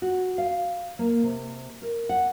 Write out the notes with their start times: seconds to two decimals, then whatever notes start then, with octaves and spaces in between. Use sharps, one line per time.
0.02 F#4
0.38 F5
0.99 A#3
1.23 C3
1.82 A#4
2.09 F#5